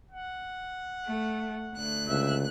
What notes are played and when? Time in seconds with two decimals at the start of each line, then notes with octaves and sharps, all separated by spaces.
0.11 F#5
1.05 A3
1.74 D2 F#6
2.08 C#2 E5